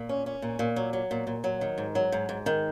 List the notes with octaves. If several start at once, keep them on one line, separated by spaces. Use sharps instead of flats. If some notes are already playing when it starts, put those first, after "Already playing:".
Already playing: A#2
C#4
C#4
A#2
A#2
F#3
F#3
A#2
A#2
F#3
D#3
G#2
F#3
G#2
G#2
D#3